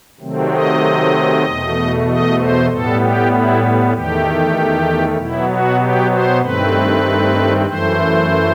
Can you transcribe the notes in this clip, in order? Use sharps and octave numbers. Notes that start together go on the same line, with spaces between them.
C3 D#3 F#3 A3 C4
D#5
E2 B2 A3
D#5
C5
A2 G3 B3 A4
G4
E4
E2 D#3 A3 G4
B2 F#3 B3 E4
F#4
G4
C5
G2 D#3 A3 C4 B4
F#2 E3 A3 C5